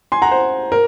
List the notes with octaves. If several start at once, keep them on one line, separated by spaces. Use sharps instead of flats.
G#5 C6
F#5 A#5
C5
A#4